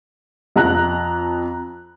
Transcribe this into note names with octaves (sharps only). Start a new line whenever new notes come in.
F2 A#5 F#6